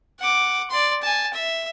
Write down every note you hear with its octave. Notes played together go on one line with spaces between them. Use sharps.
F#5 D6
D5 C6
G#5 A5
E5